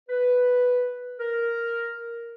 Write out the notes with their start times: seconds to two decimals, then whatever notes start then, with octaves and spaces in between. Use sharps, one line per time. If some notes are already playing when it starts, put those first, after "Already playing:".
0.09 B4
1.20 A#4